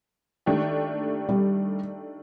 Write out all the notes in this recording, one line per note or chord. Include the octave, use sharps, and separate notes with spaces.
D#3 A3 D4 G4
G3